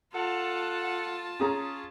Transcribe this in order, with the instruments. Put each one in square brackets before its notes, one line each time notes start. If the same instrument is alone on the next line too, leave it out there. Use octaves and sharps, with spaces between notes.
[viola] F4 A5 [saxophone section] A4 F#5
[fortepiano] C#4 G#4 A#5